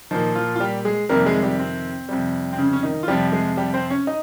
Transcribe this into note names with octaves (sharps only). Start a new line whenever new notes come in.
A#2 D#3 F3 D#4
F3 F4
F4
G3 G4
G#3 G#4
F2 C3 D#3 G3 A#3 A#4
G#3 G#4
G3 G4
C4
F2 C3 G3
C4
C#3 C#4
C#4
D#3 D#4
F4
F2 C3 F3 G3 G4
G#3 G#4
G3 G4
C4 C5
C#4 C#5
D#4 D#5